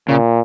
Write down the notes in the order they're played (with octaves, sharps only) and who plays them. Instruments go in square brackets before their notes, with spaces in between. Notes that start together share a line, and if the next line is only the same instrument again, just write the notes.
[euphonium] A#2 [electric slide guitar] C#3